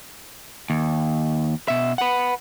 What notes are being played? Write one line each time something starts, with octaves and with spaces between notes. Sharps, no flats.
D#2
B2 E5
B4 F#5